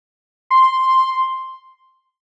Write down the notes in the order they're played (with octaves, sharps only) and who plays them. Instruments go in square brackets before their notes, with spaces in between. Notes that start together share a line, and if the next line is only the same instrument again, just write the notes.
[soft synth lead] C6